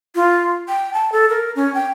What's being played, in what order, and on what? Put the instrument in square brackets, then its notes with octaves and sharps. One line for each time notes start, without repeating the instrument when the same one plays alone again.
[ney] F4
G5
A5
A4
A#4
C#4
G5